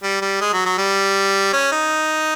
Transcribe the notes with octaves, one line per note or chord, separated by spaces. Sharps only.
G3
G3
G#3
F#3
F#3
G3
C#4
D#4